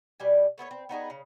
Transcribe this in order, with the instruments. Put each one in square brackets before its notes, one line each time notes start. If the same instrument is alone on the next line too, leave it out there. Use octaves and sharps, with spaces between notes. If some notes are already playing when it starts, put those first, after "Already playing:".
[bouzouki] B2 G3 G#5
A3 B3 G#4 C#5
C4
B3 D#4 F#4 G#4
C#3